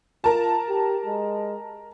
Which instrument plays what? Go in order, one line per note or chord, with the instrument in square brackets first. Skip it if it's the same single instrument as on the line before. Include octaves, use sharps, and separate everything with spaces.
[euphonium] F4 [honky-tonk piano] A#4 A5
[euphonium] G4
G#3